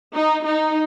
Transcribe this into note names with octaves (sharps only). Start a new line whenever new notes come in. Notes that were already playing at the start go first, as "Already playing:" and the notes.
D#4
D#4